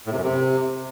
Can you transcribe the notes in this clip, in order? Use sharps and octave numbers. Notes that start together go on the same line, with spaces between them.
A2
C3
F#2
C3